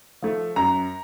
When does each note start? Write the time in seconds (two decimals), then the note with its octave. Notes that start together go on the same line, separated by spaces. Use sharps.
0.22 F3 A3
0.56 F#2 A#5